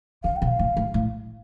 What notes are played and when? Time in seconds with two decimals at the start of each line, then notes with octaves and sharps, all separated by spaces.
0.24 D3 F5
0.36 G5
0.42 B2
0.48 F5
0.59 A2
0.77 A2
0.94 A2